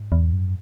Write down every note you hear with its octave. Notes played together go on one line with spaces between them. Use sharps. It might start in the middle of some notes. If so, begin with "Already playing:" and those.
Already playing: G#2
E2
F#2